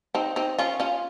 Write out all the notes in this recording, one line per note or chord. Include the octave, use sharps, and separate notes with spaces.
C4 D#4
C4 D#4
C#4 F4
C#4 F4